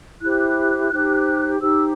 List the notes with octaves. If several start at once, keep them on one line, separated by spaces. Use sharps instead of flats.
E4 G4 C5 F#6
D#4 G4 C5
D#4 G4 C5 E6